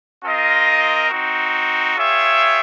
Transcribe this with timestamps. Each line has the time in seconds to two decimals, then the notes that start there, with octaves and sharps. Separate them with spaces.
0.24 C4 F4 A#4 D#5
1.10 C4 D#4 F#4
1.96 F4 G#4 C#5 E5 G5